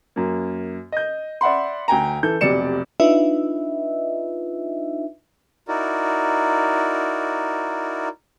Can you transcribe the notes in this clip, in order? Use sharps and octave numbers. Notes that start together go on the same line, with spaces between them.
F#2 A#3
D#5 G6
D5 E5 F#5 B5 C6
D2 G5 G#5 A#5
E3 A4 G6
F1 B1 C3 D5 C#7 E7
D4 D#4 F4 B4 D#5 E5
D#4 E4 F#4 A#4 D5